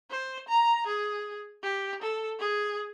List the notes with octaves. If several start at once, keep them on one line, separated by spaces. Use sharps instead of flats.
C5
A#5
G#4
G4
A4
G#4